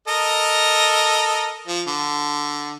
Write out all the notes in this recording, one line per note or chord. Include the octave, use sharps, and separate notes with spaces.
A4 A#4 D#5
F3
D3